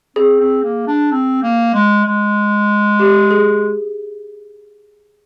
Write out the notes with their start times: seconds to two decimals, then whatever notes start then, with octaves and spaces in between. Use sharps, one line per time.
0.16 C4 G#4
0.40 C4
0.63 A#3
0.87 D4
1.11 C4
1.43 A#3
1.74 G#3
2.06 G#3
2.99 G4
3.31 G#4